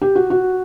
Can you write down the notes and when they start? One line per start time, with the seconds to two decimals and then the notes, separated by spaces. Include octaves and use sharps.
0.02 G4
0.15 F#4
0.30 F#4